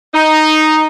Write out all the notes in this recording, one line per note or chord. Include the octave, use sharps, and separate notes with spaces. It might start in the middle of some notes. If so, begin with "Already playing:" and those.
D#4